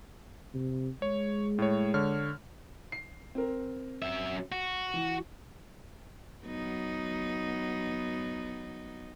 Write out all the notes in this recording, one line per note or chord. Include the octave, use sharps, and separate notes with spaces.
C3
G#3 C#5
A2 C#5
D3 C#5 F6
C7
C4 A#4
F#2 E5
F#4
E3
F#3 B3 D#4